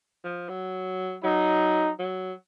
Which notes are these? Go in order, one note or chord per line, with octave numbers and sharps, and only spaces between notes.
F3
F#3
F#3 D#4
F#3